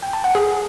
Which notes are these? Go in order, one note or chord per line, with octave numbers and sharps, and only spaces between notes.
G5
A5
F#5
G#4